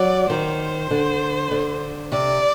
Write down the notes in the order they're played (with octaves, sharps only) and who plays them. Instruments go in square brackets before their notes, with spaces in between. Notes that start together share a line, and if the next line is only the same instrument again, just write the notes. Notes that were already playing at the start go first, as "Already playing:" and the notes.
Already playing: [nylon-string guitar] F#3 [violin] D5
[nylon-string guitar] D#3 [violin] C5
[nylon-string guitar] D3
D3
[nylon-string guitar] C3 [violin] D5